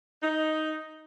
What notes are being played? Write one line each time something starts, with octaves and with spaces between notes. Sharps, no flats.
D#4